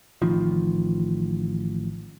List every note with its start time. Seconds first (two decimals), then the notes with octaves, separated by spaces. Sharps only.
0.22 A1 D#3 F3